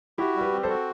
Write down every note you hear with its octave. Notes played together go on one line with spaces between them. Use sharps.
E4 F#4 G4
G3
G4 B4
C4
A4 C5
F#4